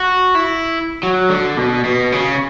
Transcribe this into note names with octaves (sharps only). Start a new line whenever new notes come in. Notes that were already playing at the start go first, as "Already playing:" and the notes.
Already playing: F#4
E4
F#3
D3
B2
B2
C#3